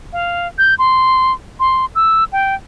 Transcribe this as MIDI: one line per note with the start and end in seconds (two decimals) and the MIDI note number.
0.13 0.48 77
0.58 0.75 91
0.79 1.33 84
1.60 1.86 84
1.95 2.24 88
2.32 2.55 79